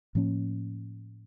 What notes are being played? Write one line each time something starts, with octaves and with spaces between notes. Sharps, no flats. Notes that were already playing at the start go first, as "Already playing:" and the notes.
A2 F3 A#3 C#4